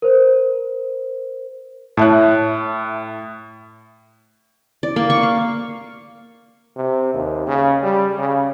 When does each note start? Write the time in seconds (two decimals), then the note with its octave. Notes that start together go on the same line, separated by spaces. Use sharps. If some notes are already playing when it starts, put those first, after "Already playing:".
0.02 A#4 C5
1.97 A2 C#5 E5 A5 F#6
4.83 D5
4.96 A#3
5.10 C#6
5.23 F5
6.76 C3
7.14 D#2
7.47 C#3
7.83 G3
8.18 C#3